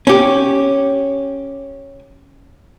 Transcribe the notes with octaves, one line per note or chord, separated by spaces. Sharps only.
C#4 G4